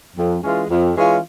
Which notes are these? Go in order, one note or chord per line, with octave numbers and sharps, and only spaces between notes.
F2
E3 G#3 C#4 F4
F2
E3 G#3 C#4 F4